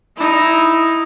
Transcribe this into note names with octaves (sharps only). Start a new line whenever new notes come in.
D#4 E4